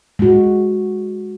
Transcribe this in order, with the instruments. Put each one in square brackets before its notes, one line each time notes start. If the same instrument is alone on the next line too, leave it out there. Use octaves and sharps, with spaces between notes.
[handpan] G#3 F#4